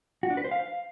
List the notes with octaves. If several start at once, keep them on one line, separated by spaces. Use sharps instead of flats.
F#4
D4
B4
C5
F5